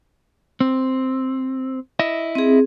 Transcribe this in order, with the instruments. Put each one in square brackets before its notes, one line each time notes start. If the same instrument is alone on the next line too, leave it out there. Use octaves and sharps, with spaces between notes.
[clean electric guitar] C4
E4 D#5 E5
[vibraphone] C4 G#4